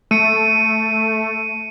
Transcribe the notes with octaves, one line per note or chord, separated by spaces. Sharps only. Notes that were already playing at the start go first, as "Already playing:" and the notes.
A3 C#7 D#7